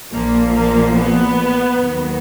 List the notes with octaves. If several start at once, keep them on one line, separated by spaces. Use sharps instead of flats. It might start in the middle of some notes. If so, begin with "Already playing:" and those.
A#1 A#2 F3 A#3
A#3
B3
D#2 D#3 F#3